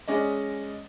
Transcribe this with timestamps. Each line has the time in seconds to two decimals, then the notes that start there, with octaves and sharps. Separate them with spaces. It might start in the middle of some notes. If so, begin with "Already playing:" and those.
0.08 G#3 C#4 D5 D#5